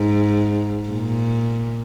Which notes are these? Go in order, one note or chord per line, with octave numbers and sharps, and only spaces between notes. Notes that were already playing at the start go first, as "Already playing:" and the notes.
Already playing: G#2
A#2